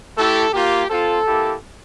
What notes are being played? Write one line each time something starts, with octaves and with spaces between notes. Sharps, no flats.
A3 E4 G4 A4
A#3 F4 G4
C4 F4 A4
A#3 E4 G4